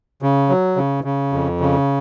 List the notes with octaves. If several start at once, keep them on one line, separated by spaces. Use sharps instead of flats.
C#3
F#3
C#3
C#3
F2
C#3